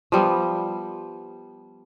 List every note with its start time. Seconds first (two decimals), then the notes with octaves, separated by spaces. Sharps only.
0.12 F3 G3 B3